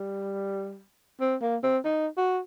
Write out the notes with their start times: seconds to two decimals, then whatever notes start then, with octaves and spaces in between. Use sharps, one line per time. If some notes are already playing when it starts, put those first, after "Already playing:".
Already playing: G3
1.20 C4
1.41 A#3
1.63 C4
1.84 D#4
2.17 F#4